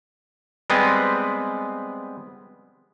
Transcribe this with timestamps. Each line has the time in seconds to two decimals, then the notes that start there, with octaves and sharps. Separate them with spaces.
0.70 G3 G#3 B3 C4 B4